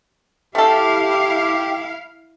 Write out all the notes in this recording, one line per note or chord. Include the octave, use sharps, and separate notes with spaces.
A3 E4 G4 A4 F5